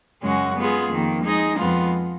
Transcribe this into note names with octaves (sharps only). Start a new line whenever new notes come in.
F#2 C#3 G#3 C#4 F#4
G#3 B3 F4 G#4
F2 D#3 A#3
G#3 D#4 G#4 D#5
F2 F3 G#3 B3 F4